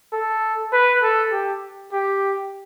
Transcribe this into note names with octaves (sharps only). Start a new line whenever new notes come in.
A4
B4
A4
G4
G4